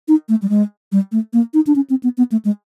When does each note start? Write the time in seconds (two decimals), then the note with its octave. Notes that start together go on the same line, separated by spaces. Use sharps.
0.08 D#4
0.29 A3
0.42 G3
0.49 G#3
0.92 G3
1.12 A3
1.33 A#3
1.54 D#4
1.67 D4
1.76 C#4
1.90 C4
2.03 B3
2.17 B3
2.32 A3
2.45 G#3